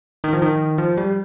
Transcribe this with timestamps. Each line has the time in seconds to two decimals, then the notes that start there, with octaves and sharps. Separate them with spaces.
0.24 D#3
0.33 F3
0.42 D#3
0.78 F3
0.97 G3